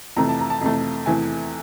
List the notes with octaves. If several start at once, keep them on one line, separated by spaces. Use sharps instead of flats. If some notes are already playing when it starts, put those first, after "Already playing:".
F2 C3 E3 A3 A#5
A5
A#5
A5
F2 C3 E3 A3
E2 C3 E3 A3 G#5